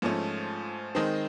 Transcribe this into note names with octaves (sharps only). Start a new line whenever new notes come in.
G#2 F3 A3 C#4
D#3 G#3 C4 D#4